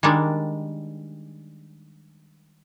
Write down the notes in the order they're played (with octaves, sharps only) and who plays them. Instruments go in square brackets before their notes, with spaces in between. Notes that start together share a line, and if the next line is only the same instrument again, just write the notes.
[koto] D#3 G3 G#3 D4